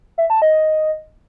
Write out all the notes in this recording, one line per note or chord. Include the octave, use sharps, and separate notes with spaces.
E5
A5
D#5